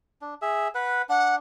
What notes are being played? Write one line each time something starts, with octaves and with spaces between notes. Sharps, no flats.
D4
G#4 E5
B4 F#5
D4 F#5